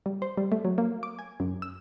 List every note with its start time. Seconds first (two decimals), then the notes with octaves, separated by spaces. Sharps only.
0.06 G3
0.22 C5
0.37 G3
0.52 A3
0.65 F#3
0.78 A#3
1.03 D6
1.19 G#5
1.40 F#2
1.62 E6